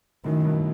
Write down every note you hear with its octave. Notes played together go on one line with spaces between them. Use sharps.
F#2 A2 D#3
G2 B2